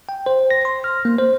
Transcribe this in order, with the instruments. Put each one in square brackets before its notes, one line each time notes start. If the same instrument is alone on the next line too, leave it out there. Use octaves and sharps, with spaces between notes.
[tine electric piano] G5
C5
A#6
C6
F6
A#3
C5